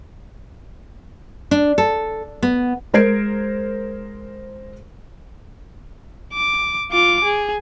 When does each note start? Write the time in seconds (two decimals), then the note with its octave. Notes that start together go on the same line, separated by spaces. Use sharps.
1.51 D4
1.78 A4
2.43 B3
2.93 G#3 A#4 C5 G#6 C7 D7
6.33 D6
6.92 F4 D6
7.24 G#4